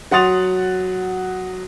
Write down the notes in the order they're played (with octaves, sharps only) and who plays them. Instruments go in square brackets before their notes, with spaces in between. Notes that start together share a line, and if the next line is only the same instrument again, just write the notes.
[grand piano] F#3 F#5 C6 D#6 A6 F7